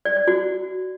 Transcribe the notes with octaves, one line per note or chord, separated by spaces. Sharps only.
D5
D5
F#4